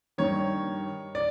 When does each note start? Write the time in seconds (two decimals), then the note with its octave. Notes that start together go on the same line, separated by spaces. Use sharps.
0.18 G2 D#3 C#5
1.15 D5